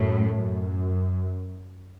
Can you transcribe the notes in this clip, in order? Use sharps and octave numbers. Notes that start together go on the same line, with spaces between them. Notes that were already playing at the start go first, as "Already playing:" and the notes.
Already playing: F#2 A2
F#2